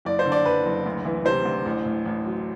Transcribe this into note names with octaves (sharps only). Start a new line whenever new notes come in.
F#1 D5
C5
D3
D5
F#1 B4
F#1
D2
E3
C3 C5
D2
A1
A2
A1
F#3